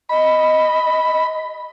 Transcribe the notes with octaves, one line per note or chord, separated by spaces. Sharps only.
D#5 B5